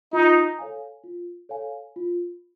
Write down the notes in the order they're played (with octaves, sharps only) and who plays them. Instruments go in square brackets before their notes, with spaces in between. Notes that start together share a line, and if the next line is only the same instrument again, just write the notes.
[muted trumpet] D#4 [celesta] F4
[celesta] A4 C#5 F5 G#5
F4
A4 C#5 F5 G#5
F4